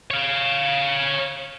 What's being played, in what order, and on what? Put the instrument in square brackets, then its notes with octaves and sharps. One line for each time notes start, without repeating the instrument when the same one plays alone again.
[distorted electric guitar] C#5 F5